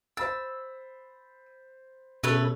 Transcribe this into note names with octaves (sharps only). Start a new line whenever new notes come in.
C5 B5 E6 A6
B2 A3 C#4 G#4 A4 B4 C#5